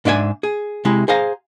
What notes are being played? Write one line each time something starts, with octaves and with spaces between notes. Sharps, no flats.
G#2 D4 D5 E5 G#5
G#4
C3 G#3 E4
G#4 C5 F5 A#5